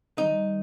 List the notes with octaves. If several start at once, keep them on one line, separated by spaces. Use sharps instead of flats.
D#3 G3 A#3 D#4